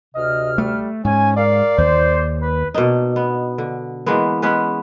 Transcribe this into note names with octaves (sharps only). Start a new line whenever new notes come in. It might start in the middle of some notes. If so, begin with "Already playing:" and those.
D2 C3 D#5 F6
G3 A3
G#2 C#4 G#5
A#4 D5 F5
D#2 C5
B4
B2 A#3 D4 D#4
B3
D3
E3 G#3 A#3 B3
G#3 B3 C#4 B4